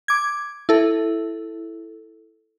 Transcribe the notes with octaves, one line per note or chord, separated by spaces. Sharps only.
D6 G#6
E4 A4